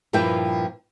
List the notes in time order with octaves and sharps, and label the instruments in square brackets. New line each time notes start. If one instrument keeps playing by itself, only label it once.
[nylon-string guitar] G2 A#2 F3 E4 B4 G5